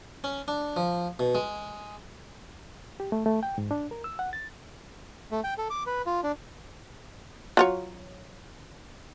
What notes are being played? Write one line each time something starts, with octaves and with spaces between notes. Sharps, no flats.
C#4
D4
F3
B2
G#3
G4
A3
A3
G5
G#2
D4
A#4
E6
F#5
A6
A3
G5
A4
D6
B4
F4
D4
F#3 F4 C#5